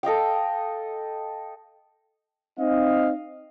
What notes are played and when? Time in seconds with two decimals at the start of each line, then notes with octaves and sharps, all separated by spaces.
0.03 A4 D#5 F5 G5
2.58 C4 D#4 D#5 F5